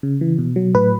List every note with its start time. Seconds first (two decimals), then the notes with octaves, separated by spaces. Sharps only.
0.03 C#3
0.21 E3
0.38 B2
0.56 F#3
0.74 A2 B4